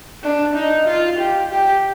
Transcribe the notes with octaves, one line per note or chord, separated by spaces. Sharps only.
D4
D#4
F4
G4
G4